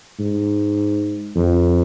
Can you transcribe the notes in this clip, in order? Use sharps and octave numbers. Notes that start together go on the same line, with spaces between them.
G#2
F2